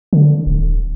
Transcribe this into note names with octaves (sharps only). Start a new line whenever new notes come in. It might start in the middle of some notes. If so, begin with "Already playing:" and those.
D3
D1